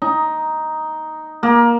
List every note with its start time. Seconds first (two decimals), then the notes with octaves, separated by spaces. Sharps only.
0.02 D#4
1.43 A#3